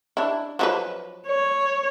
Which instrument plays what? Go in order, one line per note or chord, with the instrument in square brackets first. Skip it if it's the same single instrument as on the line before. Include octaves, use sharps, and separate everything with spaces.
[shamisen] D4 E4
F3 F#3 B4
[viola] C#5